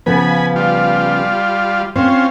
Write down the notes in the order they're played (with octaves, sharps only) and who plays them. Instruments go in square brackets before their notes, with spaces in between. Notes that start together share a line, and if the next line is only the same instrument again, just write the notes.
[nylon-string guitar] C#3 F3 B3 [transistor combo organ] G#5 B5
[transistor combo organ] G3 F4
[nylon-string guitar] C4 [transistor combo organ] C#4 F4 C5